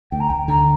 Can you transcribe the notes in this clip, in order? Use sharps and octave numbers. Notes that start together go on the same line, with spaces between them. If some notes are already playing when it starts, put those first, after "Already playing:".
D2 G5
A#5
D2 G5
D3 A#5